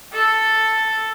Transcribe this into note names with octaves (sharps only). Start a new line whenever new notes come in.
A4